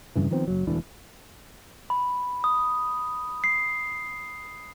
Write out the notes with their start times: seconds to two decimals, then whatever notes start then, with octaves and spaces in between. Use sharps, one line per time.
0.16 F1 G2 C#3 E3
0.31 D#3 F3 B3 C4
0.47 F#1 F#3
0.67 E1 D2 E3 D4
1.90 B5
2.44 D#6
3.44 C7